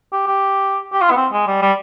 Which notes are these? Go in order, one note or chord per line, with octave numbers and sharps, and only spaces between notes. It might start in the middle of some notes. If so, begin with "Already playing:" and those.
G4
G4
G4
F4
B3
C4
G#3
G3
G3